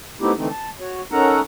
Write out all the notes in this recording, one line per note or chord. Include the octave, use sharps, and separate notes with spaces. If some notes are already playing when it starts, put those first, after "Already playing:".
A3 B3 C4 D#4 E4 G4
D3 E3 A3 C4 D#4
A5
F#4 C#5
C#4 D#4 A4 A#4 F#5 A#5